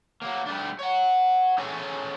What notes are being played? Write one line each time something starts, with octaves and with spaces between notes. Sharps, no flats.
F#3 A#3
G3 A3 D4
C#5 F#5
C#4 E4 G#4 A4 C#5